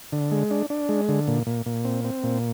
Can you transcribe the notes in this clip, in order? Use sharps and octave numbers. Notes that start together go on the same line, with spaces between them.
D3
G#3
D4
D4
G#3
D3
A#2
A#2
A#2
C4
C4
A#2